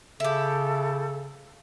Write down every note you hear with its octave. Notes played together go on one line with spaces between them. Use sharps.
C#3 E4 G4 A4